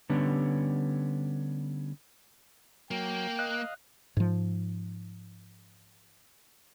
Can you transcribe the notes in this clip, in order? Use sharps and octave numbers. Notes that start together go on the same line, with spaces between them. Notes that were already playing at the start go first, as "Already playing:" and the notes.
D3 G3 B3 C#4
F#3 A#3 G5
D#5 F5 F#6
G#2 F3